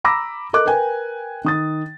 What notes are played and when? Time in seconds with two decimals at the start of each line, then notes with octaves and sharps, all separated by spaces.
0.04 A#5 B5 D6 E6 A#6
0.53 A4 A#4 D#5 D6 F#6
0.65 A#4 B4 G5 G#5
1.44 D#3 D#6 A6